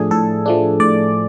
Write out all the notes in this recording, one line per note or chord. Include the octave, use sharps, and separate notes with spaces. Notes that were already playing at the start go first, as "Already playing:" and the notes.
Already playing: A2 F3 A3 D4 G#4 A4 G#5
A2 A4
F3 A3 D4
A2 D5